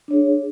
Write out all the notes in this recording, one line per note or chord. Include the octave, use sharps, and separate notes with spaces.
D4 G#4 C#5